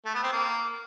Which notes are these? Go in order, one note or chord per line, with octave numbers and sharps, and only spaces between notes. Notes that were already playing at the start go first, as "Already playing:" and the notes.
A3
B3
C4
A#3